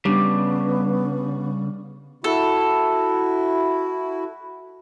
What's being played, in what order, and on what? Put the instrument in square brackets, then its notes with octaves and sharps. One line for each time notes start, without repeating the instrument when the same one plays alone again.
[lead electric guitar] C#3 [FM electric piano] G3 [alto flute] B3 [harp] D4
[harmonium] E4 F#4 [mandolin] A4